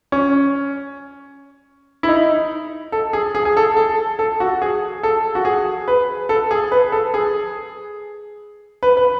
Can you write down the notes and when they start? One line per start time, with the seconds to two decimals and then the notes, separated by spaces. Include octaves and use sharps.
0.12 C#4
2.03 E4
2.09 D#4
2.92 A4
3.13 G#4
3.35 G#4
3.45 G#4
3.57 A4
3.77 A4
4.19 A4
4.40 F#4
4.62 G#4
5.03 A4
5.35 F#4
5.45 G#4
5.88 B4
6.29 A4
6.51 G#4
6.72 B4
6.92 A4
7.14 G#4
8.83 B4
8.97 B4